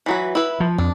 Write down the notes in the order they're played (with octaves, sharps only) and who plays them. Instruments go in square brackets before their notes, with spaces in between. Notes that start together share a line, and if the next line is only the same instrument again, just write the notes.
[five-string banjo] E3 F#3 B4
E4 B4
[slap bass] F3
[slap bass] F2 [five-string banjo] D4